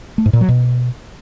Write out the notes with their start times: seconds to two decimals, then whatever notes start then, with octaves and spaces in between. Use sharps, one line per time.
0.18 A3
0.26 G#2
0.33 A#2
0.41 F#3
0.49 B2